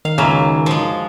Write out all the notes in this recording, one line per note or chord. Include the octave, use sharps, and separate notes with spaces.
D#3 F5
C#2 F#2 C#3 A#3 E5
F3 G#3